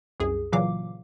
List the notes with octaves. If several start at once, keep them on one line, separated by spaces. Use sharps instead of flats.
C2 F#2 G#4
A#2 C#3 E3 F#3 F5 D6